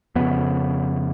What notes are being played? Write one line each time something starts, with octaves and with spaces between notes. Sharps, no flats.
F2 C#3 B3